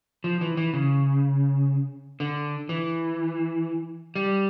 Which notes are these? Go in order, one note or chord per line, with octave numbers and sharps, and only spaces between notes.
F3
E3
E3
C#3
D3
E3
G3